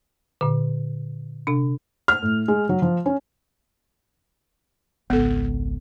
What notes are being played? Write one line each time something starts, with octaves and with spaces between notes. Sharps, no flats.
A#2 D3
C3 D4
F6
A2
G#3
F#3
F3
C#4
G#1 C#2 B3 A4